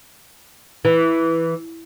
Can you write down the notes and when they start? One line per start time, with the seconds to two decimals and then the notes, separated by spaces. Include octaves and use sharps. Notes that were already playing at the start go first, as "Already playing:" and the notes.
0.85 E3